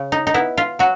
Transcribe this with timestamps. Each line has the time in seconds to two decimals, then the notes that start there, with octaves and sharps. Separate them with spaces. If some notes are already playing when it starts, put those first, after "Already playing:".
Already playing: C#3
0.12 D#4
0.27 D#4
0.34 B3 E4
0.57 F4
0.79 F#3 F#4